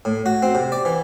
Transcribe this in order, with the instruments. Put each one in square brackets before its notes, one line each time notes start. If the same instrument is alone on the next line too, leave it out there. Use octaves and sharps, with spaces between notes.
[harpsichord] A2
F#4
C4
C3
D5
E3